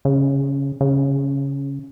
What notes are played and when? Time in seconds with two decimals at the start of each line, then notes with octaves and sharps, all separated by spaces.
0.05 C#3
0.81 C#3